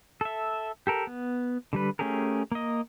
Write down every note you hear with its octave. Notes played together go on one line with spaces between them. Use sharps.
A4 E5
G4 A4 A#4
B3
D3 G3 B4
A3 C#4 G4 G#4 A#4
A#3 D#5